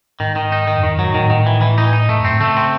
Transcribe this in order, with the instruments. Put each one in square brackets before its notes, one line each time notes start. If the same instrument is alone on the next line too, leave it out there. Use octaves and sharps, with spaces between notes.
[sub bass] G#2 [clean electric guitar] D#3
[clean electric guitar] D#3
D#4
D#3
[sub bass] F#2
[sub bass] E2 [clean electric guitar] D#3
[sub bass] F#2 [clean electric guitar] F#3
[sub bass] G#2
[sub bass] A2 [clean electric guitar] D#3
[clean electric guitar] D#3
E3
E3
D#4
D#4
[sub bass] G#2 [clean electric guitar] A3
[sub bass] F#2
[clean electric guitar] C4
[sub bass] A2
[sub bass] C#3 [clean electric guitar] A3
[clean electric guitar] C4